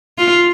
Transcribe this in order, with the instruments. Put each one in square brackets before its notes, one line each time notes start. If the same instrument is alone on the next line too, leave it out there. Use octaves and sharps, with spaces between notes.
[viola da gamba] F4